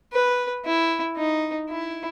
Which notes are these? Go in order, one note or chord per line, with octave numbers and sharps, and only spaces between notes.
B4
E4
D#4
E4